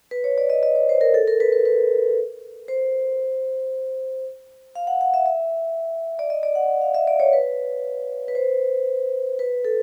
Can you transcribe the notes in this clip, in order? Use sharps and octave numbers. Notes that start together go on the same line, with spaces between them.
B4
C#5
D5
D#5
D#5
C#5
C5
A#4
A4
A#4
B4
B4
B4
C5
F5
F#5
F#5
E5
E5
D5
D#5
D5
F#5
F5
E5
D5
C#5
B4
B4
C5
B4
A4